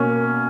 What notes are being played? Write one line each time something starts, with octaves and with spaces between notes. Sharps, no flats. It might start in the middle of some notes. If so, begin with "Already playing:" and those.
Already playing: B2 A#3 C#4